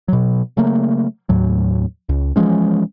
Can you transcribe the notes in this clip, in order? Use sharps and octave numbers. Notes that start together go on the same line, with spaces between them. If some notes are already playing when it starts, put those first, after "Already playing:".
B2 F#3
C#3 F#3 A3 A#3
D#2 A2 F#3
C#2
E3 F3 G#3 C#4